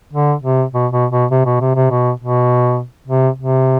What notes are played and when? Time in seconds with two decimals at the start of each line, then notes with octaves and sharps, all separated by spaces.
0.13 D3
0.43 C3
0.73 B2
0.92 B2
1.12 B2
1.31 C3
1.46 B2
1.61 C3
1.76 C3
1.91 B2
2.20 B2
3.08 C3
3.38 C3